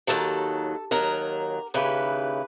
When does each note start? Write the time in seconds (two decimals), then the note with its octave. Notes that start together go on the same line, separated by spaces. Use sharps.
0.07 D#2 D#3 F#3 A4
0.91 D#2 D#3 F#3 A#4
1.74 D#2 C#3 E3 B4